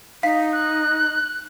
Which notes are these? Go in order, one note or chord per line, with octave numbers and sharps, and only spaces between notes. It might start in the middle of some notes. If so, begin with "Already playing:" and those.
D#4 F5 B6
F#6